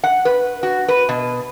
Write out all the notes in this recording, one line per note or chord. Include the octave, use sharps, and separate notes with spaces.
F#5
B4
F#4
B4
B2